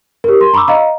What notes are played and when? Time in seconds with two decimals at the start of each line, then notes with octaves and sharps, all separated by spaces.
0.24 G4 A#4
0.41 C6
0.53 A#5 B5 C#6 D6 E6
0.68 D#5 F5 A#5